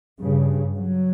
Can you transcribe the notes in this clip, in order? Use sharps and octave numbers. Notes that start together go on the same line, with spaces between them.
G2 C#3
F#3